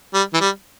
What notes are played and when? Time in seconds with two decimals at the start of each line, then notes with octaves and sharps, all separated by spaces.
0.14 G3
0.34 E3
0.41 G3